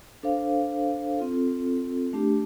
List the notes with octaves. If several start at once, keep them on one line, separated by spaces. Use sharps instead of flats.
D4 A4 C5 F5
C4 F4 A4
A3 D4 G4